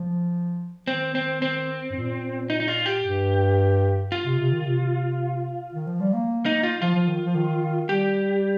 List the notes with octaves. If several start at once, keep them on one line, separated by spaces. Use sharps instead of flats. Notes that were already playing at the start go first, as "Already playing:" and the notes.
Already playing: F3
D#3 C4
C4
C4
G2
A#2
D#4
D#4
F4
G4
G2
F4
C3
C3
D#3
C3
D#3
F3
G3
A#3
D#4
F4
F3 F4
F3
D#3
F3
D#3
G3 G4